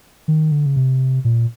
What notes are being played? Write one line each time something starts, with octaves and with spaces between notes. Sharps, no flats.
D#3
D3
C#3
C3
A#2